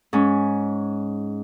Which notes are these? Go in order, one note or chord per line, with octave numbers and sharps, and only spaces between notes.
G#2 C#4